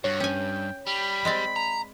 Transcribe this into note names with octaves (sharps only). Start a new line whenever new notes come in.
G2 F#4 C#5
C#4 G5 G#5
G3 B5
G#3 C4 D5
A#5